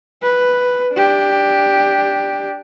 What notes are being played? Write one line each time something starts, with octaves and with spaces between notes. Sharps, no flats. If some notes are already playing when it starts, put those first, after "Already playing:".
B4
D4 G4